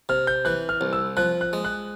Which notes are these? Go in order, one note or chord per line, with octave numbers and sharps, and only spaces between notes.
C3 F6
G6
E3 F#6
F6
C2
E6
F3 F#6
F#6
G#3
F#6